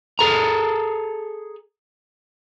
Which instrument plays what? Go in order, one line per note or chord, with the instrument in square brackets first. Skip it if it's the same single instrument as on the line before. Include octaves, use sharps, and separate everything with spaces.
[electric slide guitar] G#4 A4 A#5